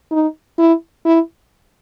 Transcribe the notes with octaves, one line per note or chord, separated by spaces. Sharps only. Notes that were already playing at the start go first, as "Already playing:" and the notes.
D#4
E4
E4